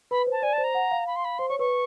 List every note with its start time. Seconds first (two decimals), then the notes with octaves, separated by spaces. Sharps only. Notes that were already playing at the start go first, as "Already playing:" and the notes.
0.11 B4 B5
0.27 C5
0.32 A5
0.42 D5 G#5
0.53 A5
0.58 C5
0.64 A#5
0.75 F#5
0.91 F5
1.07 B5
1.16 C6
1.24 B5
1.38 C5 C6
1.49 C#5 C#6
1.59 B4 C#6